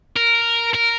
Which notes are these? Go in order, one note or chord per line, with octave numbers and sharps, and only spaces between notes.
A#4
A#4